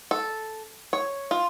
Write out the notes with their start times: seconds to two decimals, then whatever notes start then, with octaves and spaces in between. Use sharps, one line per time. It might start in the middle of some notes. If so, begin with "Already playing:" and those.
0.11 A4
0.93 C#5
1.31 F4